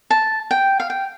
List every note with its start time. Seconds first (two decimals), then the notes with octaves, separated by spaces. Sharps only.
0.10 A5
0.51 G5
0.80 F5
0.90 G5